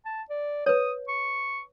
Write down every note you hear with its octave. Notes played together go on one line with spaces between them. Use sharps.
A5
D5
B4 C#5 D#6
C#6